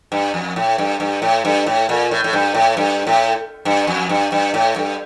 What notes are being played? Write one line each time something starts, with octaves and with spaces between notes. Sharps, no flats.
G2
F2
A2
G2
G2
A2
G2
A2
A#2
A2
A2
G2
A2
G2
A2
G2
F2
G2
G2
A2
G2